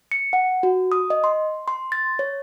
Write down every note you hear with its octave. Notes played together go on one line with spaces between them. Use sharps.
C#7
F#5
F#4
D#6
D#5
C6
C6
A6
C#5